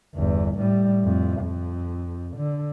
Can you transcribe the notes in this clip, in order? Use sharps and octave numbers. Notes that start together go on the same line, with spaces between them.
G1 E2
A2 G3
F2 A2
F2
D3